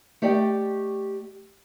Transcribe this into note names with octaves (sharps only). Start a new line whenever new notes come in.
A3 G4 D5 D#5 G5